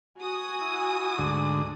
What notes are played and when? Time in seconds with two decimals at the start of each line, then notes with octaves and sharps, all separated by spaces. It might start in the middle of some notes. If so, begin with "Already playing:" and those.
0.18 F#4 G#5 D#6
0.61 E4
1.18 D2 G#2 D3